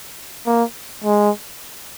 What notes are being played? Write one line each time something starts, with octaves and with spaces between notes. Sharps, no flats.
A#3
G#3